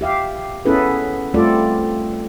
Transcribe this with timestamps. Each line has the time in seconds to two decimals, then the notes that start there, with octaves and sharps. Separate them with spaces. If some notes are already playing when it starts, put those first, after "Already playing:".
0.01 G4 E5 F5
0.65 B3 C#4 E4 G#4 A4 B4
1.34 G3 A3 C4 F4 A4 D5